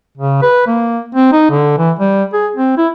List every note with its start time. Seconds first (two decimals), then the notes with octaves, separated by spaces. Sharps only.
0.18 C#3
0.42 B4
0.67 A#3
1.15 C4
1.32 D#4
1.50 D3
1.78 E3
1.99 G3
2.33 G#4
2.56 C4
2.77 E4